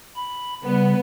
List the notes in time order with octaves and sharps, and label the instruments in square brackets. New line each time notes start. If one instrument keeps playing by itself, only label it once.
[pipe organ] B5
[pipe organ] C#3 G3 [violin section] B3